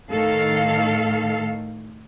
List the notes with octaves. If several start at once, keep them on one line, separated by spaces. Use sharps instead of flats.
A2 D#3 A4 F5